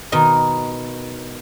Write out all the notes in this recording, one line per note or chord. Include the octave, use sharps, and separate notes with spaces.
B2 D#3 D#4 A#4